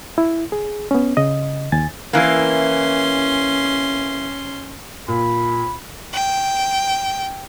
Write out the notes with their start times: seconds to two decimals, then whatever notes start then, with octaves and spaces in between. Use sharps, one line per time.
0.18 E4
0.52 G#4
0.91 B3 C#4
1.17 C#3 D#5
1.72 D#2 G#5 A6
2.13 E3 A#3 C#4 C6
5.08 A#2 B5
6.12 G5